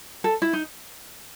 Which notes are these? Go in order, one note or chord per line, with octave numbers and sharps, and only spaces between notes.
A4
E4
D#4